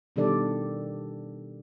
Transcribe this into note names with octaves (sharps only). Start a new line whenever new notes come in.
B2 D#3 G3 D4 A4 D5